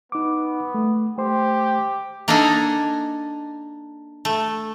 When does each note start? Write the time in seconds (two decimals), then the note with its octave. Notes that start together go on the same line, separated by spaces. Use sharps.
0.12 B3 D#4 D6
0.74 A3
1.18 A3 G4 C5 C6
2.28 A#3 D4 D#4 A4 G#5 A#5
4.25 A3